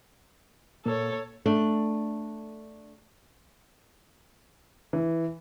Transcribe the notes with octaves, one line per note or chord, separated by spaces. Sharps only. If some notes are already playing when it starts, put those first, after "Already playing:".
A#2 A#3 A4 C#5
A3 D4
E3